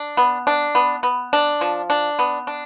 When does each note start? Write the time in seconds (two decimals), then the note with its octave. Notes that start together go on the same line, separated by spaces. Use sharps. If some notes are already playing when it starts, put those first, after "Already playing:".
Already playing: D4
0.17 B3
0.47 D4
0.75 B3
1.03 B3
1.33 D4
1.61 F3
1.90 D4
2.19 B3
2.47 D4